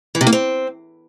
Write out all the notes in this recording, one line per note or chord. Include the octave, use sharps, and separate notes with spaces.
E3
C3
A#3
C4